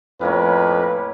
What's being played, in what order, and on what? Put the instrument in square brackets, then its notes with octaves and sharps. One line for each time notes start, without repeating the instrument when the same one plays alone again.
[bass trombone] F2 [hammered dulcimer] A2 A#3 C#4 [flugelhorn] B4